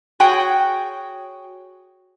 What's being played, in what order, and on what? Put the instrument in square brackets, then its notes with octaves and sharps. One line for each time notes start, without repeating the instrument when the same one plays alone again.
[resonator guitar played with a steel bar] F#4 G#4 C#5 G5 G#5